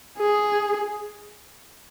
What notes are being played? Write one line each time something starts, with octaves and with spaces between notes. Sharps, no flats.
G#4